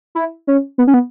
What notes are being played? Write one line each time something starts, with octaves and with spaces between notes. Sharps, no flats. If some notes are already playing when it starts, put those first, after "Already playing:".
E4
C#4
B3
C#4
B3